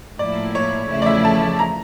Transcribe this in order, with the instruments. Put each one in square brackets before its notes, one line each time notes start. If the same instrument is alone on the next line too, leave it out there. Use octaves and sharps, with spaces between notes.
[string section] A2 F3 A#3 E4 [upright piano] D5
[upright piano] C#5
[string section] E2 C#3 F3 A3 E4
[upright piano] D5
E5
A5
A#5